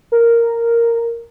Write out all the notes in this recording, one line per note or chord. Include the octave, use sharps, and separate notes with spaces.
A#4